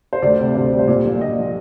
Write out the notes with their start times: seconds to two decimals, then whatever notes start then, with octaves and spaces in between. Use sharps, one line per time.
0.13 C5
0.22 D2 D5
0.39 C3
0.54 D2 C5
0.72 G3
0.79 C5
0.87 A#2 D5
1.05 A#1
1.20 A#2 D#5
1.38 F3